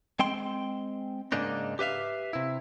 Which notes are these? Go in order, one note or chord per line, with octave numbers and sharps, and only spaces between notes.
G#3 C4 G5 C6
G#2 C#3 A#3 D4 D#4
G4 B4 E5 F5
C3 E4